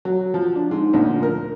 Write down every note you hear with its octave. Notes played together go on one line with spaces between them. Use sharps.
F#3
F3
D4
G#2
D2 A#2 F3
A#4